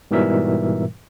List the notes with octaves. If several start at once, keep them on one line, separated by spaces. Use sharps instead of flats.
G#2 B2 E3 G3 A#4 E5